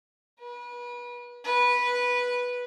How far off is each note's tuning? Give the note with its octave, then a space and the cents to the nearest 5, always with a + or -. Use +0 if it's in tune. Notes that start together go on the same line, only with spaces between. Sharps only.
B4 -30
B4 -10